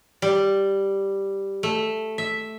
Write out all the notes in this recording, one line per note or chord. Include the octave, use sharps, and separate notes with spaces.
G3
A3
E5